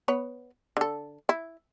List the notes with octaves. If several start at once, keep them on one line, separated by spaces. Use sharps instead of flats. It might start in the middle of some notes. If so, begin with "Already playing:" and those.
B3 B4 C#5
D3 A4
E4